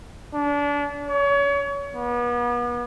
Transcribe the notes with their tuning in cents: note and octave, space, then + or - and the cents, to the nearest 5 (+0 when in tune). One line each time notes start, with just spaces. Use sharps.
D4 -30
C#5 +30
B3 -35